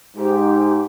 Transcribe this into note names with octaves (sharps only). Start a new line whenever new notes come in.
G#2 G4